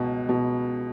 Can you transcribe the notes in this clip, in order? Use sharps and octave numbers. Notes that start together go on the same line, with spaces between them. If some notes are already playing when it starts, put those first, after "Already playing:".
Already playing: C#2 B2
B2